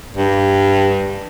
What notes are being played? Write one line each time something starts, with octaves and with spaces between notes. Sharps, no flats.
G2